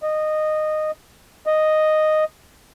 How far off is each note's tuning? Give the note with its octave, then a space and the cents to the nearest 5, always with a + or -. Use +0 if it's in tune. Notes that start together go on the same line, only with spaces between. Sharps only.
D#5 -15
D#5 -5